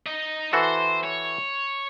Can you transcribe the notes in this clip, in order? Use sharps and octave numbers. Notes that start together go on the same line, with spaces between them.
D#4 D#5
E3 F#4 A4 C5
C#5